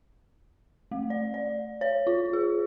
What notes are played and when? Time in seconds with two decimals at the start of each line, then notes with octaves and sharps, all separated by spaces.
0.91 A3
1.10 D5
1.34 D5
1.81 C#5
2.07 F4
2.33 G#4